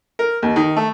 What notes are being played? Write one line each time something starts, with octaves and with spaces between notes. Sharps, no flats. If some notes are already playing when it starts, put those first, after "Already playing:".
A#4
D#2
D#3
A3